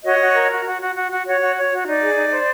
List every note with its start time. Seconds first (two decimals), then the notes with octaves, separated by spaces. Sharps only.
0.03 F#4 C#5 D#5
0.19 F#4
0.34 A#4
0.50 F#4
0.64 F#4
0.79 F#4
0.94 F#4
1.10 F#4
1.25 F#4 C#5
1.40 F#4
1.55 C#5
1.71 F#4
1.86 D#4 D5
2.02 G#4
2.16 D#4
2.31 C5